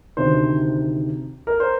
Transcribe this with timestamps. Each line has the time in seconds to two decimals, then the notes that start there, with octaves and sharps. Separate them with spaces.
0.17 D2 C3 D#3 C5
1.47 A#4
1.60 C5